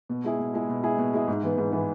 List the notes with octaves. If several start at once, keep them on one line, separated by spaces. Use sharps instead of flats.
B2
G#3 E4 G#4
B2
G#3 E4 G#4
B2
G#3 E4 G#4
B2
G#3 E4 G#4
G#2
E3 B3
G#2
E3 B3